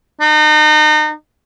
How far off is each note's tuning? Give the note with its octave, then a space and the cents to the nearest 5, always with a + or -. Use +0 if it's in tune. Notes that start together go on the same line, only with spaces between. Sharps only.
D#4 -35